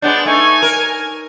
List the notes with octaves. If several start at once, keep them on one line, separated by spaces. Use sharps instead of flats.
G#3 B3 D4 G6
A3 D#4 G#5
A#4